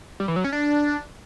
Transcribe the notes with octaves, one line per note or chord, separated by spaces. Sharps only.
G3
E3
F#3
C#4
D4